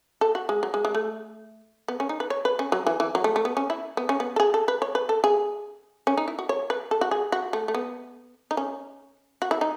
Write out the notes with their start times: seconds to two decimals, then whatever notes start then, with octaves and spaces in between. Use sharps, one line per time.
0.21 A4
0.35 F#4
0.49 G#3
0.63 F#3
0.74 G#3
0.85 G#3
0.95 A3
1.88 B3
2.00 C#4
2.09 D#4
2.20 B4
2.30 C#5
2.45 B4
2.59 C#4
2.72 F#3
2.87 E3
3.00 E3
3.15 F#3
3.24 A3
3.36 A3
3.45 B3
3.57 C#4
3.70 E4
3.97 B3
4.09 C#4
4.20 B3
4.36 A4
4.40 G#4
4.54 A4
4.68 B4
4.82 C#5
4.95 B4
5.09 A4
5.24 G#4
6.07 C#4
6.17 D#4
6.28 E4
6.39 F#4
6.49 C#5
6.70 B4
6.91 A4
7.01 F#4
7.11 G#4
7.32 F#4
7.53 A3
7.68 A3
7.75 B3
8.51 D#4
8.57 C#4
9.42 F#4
9.51 E4
9.61 D#4